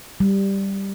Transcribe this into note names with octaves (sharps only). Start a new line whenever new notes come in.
G3